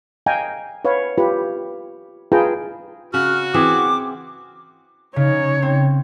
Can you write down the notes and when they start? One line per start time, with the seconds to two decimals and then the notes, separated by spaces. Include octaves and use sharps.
0.26 D#5 F5 G5 G#5 A#5
0.85 B4 C#5 F5 F#5
1.18 F4 G4 B4
2.32 F4 G#4 B4 G5 A5 A#5
3.14 C#3 F#4 F6
3.54 E3 C4 G#4 D6
5.16 C#3 D#4 C#5
5.62 C4